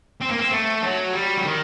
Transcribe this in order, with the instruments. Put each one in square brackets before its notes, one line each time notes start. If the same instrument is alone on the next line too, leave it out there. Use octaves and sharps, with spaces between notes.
[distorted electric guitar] C4
A#3
C4
A3
F#3
G3
F#3
D#3